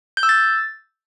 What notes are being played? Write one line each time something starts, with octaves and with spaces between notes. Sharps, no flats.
G6
E6
A6